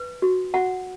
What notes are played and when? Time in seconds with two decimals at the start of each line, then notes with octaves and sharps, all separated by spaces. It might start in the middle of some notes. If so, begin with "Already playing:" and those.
Already playing: B4
0.22 F#4
0.54 F#4 F#5